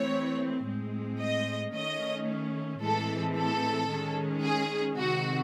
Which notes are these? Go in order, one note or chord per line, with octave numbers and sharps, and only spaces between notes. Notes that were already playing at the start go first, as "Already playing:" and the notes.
Already playing: E3 A3 C4 C#5
A2 G#3 C4
D#5
D#3 A3 C#4 D#5
A2 E3 G#3 C4 A4
A4
D#3 G#3 C#4
G#4
C3 D#3 G#3 C4 F#4